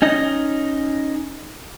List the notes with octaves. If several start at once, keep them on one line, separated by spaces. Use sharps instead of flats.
C#4 D#4 D#5